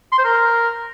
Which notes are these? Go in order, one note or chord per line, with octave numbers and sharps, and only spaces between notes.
C6
C5
A#4